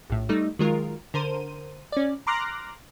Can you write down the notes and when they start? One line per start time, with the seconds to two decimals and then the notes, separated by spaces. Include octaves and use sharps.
0.10 A#1 A2
0.29 G3 A3 D#4
0.59 D#3 F#3 G#3 F4 A#4
1.14 D3 A#4 C5 D#7
1.92 C#4 D5
2.27 A#5 C6 D6 F6 F#6 A#6